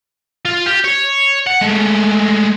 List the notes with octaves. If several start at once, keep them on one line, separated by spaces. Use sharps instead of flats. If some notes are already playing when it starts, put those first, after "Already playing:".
F4
G4
C#5
F#5
G#3 A3